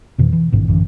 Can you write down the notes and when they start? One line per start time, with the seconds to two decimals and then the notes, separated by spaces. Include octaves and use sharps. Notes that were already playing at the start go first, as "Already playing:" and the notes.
0.18 F2 B2 D#3 E3
0.33 E3
0.52 A1 G#2 B2 D#3
0.68 A1 F#2 D3 E3